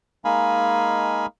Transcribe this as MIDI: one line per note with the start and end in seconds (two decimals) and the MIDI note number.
0.25 1.26 56
0.25 1.26 58
0.25 1.26 63
0.25 1.26 77
0.25 1.26 80
0.25 1.26 83